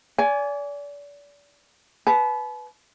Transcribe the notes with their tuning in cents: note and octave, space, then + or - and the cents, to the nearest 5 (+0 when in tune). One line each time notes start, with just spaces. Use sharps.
D5 -35 G#5 +5
B4 +0 A5 -40